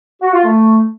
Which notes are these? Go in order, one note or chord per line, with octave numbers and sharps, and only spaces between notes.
F#4
F4
A3